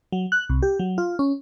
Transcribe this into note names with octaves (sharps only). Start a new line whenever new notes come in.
F#3
F#6
C2
G4
F#3
F4
C#4